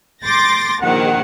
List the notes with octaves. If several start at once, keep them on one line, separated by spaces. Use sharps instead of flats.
C6 D6 G6 A6 A#6
A#1 D#3 F#5